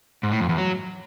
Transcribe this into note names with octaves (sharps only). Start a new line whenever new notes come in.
G#2
A2
F2
E2
F#3